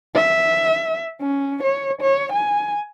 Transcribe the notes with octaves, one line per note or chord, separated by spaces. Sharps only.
E5
C#4
C#5
C#5
G#5